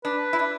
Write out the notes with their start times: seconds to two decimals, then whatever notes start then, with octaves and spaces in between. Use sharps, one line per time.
0.04 D4 B4
0.33 E4
0.39 D4